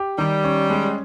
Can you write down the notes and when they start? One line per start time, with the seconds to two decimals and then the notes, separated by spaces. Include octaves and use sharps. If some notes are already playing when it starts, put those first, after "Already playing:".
Already playing: G4
0.18 D#3 G3
0.44 C#4
0.70 G#3